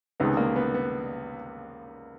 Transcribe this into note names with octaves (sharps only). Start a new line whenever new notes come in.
C#2 C3 D#3 G#3 B3
A#3
B3
B3